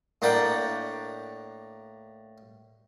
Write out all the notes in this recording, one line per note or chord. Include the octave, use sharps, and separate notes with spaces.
A2 A#3 D4 F#5 G5